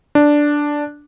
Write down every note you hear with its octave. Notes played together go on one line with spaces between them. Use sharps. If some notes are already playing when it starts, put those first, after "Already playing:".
D4